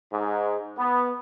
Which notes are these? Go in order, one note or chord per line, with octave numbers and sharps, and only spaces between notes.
G#2
B3